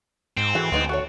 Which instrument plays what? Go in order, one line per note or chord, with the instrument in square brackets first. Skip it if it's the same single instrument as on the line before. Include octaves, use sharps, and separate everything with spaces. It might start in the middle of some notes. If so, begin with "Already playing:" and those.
[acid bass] G#2 [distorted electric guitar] C4
[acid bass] E3 [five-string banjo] F#4 G#4 A4
[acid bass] D2 [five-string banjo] G#3 B3 D#4
[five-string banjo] F#4 A4 C#5